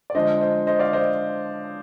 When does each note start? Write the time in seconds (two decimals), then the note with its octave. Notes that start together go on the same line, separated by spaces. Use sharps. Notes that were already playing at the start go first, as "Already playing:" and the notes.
0.10 D5
0.15 D3 F3 G#3 C5 D#5
0.41 C5 D#5
0.67 C5 D#5
0.79 D5 F5
0.93 C5 D#5